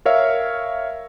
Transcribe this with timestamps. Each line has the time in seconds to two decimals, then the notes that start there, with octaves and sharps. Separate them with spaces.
0.05 A#4 C#5 E5 F5